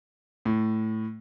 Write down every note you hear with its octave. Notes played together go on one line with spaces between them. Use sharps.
A2